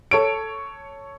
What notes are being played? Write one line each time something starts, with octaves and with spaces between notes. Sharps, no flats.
A4 C#5 D7